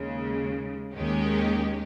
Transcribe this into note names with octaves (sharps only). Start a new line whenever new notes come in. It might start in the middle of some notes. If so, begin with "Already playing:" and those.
Already playing: D#2 C#3 G#3
D#2 D#3 G#3 C#4 G4